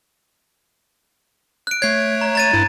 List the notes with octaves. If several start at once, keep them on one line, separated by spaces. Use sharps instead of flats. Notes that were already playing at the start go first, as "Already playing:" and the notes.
F#6 D7
A3 C#5 G#6 C7
A#5
A#5 A6 D#7
G2 E4